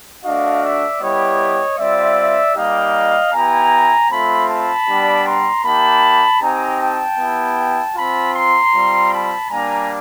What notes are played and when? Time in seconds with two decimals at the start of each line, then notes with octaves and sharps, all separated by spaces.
0.24 A3 D4 F#4 D#5 F5
0.63 D5 E5
1.01 G3 B3 E4 G4 C#5 D#5
1.78 G3 C4 F4 D5 E5
2.55 G3 A#3 D#4 G4 D#5 F5
3.32 B3 E4 G4 G#5 A#5
4.10 A3 C4 F4 A5 B5
4.49 A5 B5
4.88 G3 B3 D4 G4
5.26 A#5 C6
5.65 A#3 D#4 G4 A5 B5
6.42 C4 D#4 G4 G#5 A#5
6.81 G5 A5
7.19 B3 E4 G4
7.96 C4 F4 A5 B5
8.35 A#5 C6
8.74 G3 C4 F4
9.13 A5 B5
9.50 G3 A#3 D4 G#5 A#5